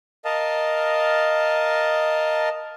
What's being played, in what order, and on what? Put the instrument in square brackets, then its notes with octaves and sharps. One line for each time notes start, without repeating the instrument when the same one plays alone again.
[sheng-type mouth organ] A#4 D#5 F5 A5